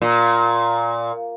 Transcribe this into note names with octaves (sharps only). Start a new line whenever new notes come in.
A#2